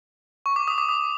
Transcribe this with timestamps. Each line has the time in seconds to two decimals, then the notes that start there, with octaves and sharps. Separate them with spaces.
0.46 C#6
0.56 D6
0.68 D#6
0.78 D6
0.89 D#6